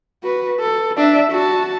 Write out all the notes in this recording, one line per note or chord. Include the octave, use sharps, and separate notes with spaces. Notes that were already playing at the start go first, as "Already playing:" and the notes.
F#4 B4
A4
D4 E5
F#4 A5